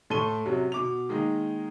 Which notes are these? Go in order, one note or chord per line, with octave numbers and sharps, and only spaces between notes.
A2 A4 C6 C#6 D#7 G7
F#2 C3 F#3
B2 D6 F7
D#3 G#3 A#3 D#4